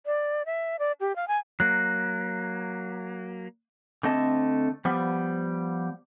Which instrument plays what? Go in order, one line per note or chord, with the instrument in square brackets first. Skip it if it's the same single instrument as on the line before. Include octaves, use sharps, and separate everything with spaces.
[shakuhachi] D5
E5
D5
G4
F5
G#5
[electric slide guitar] F#3 A#3 [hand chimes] F#6
[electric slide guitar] D3 A3 C4 D#5 A5
F3 G3 B3